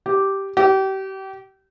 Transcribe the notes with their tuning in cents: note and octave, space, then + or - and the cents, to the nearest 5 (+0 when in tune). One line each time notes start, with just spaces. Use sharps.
G4 -5
G4 -30